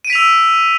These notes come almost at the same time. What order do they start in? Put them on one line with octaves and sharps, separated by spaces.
D#7 D7 B6 F7 E6